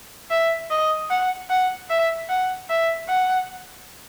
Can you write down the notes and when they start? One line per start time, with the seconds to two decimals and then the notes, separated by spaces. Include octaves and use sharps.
0.30 E5
0.71 D#5
1.10 F#5
1.50 F#5
1.90 E5
2.30 F#5
2.70 E5
3.09 F#5